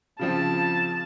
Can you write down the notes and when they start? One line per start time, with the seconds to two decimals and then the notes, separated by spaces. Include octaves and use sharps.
0.19 C#3 F3 C4 A5